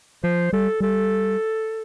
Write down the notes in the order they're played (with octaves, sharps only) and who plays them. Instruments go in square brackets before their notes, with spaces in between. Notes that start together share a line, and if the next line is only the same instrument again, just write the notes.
[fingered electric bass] F3 [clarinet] C5
[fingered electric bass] G3 [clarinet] A4
[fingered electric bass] G3 [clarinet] A4